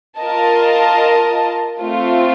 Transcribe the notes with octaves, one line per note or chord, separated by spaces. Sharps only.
F4 A#4 D#5 A5
A3 C4 F4